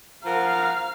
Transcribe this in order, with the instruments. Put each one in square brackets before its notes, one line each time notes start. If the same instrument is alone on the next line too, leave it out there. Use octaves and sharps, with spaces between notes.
[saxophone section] F3 A#4 F#5 [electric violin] F5 F6 [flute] A#5